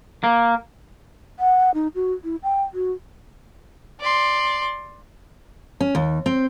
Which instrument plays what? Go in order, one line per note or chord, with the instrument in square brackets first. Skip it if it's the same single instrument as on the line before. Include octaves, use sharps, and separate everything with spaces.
[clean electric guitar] A#3
[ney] F#5
D#4
F#4
E4
G5
F#4
[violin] D5 C6
[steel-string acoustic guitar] C#4
D#2
C4